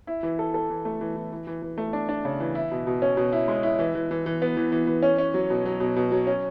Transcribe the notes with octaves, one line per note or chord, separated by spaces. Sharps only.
E4
E3
A4
A4
E3
A3
E3
E3
E3
E3
E3
A3
D4
D4
C#3
E3
E4
B2
B2
C#4
B2
E4
G#3
E4
E3
E3
E3
E3
B3
E3
E3
E3
C#4
C#4
F#3
B2
F#3
B2
B2
F#3
C#4